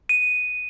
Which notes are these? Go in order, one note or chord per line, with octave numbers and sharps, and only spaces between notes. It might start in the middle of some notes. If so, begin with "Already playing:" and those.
D#7